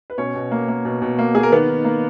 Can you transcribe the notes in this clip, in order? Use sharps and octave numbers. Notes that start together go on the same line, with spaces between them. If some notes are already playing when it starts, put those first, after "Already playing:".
B4
B2 C#4 C#5
B2
A#3
A#3
B2
B2
A#3
A#3 G#4
A#4
D#3 B3 B4
D#3
A#3